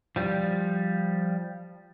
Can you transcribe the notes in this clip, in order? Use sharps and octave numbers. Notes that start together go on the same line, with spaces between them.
F3 G3